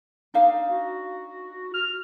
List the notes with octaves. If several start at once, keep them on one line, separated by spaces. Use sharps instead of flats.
D4 D#4 F5
F#4
F6